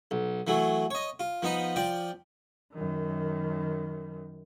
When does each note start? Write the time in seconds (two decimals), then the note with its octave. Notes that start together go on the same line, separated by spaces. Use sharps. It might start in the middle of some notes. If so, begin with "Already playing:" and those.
0.11 B1
0.47 E3 F#3 A3
0.91 C#5 D#5
1.20 F4
1.42 F3 B3 D#4 B5
1.76 F3 D5 G5
2.73 F#2 D#3